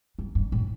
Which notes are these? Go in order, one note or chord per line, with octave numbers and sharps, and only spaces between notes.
G2
G2
A2